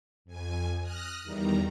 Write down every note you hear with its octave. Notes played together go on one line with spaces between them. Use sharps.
F2 G#5
D#6 F6 F#6 A#6
E2 D#3 G3 A#5